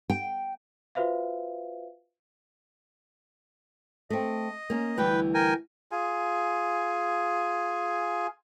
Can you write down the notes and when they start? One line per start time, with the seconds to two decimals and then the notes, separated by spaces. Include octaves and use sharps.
0.10 G5
0.95 F4 F#4 B4 C5 E5 F5
4.10 A3 C4 D#5
4.70 A#3 C#4
4.98 D2 E3 G3 B4 G5
5.34 A#4 G5 G#5
5.92 F4 G#4 G#5